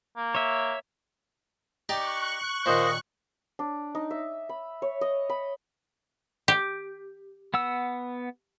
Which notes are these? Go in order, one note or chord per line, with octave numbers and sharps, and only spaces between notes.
A#3
C#5 E5
D#4 G4 D5 C#6 F#6
D#2 A#2 F4 A#4 C5 D#5
D4
D#4
E5
B5
C#5
D#5
B5
G4
B3 F#5 E6